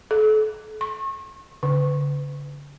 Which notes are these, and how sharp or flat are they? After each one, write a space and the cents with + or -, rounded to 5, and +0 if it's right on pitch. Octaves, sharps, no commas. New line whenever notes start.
A4 -35
C#6 -35
D3 -45